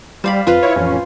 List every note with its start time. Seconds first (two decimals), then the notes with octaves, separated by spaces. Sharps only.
0.24 G3 C5 F5 B5
0.47 F2 F4 B4 C5
0.63 E4 C#5
0.76 A1 F2 C#4